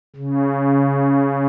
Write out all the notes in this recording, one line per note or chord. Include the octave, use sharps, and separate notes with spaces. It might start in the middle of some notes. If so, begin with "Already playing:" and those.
C#3